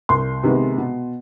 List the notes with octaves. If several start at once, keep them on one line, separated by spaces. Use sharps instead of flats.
C2 C6
C3 D#3 G#3 B3
B2